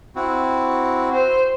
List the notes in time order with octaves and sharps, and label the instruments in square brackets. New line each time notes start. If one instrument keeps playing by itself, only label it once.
[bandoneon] C4 E4 F#4
[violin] C5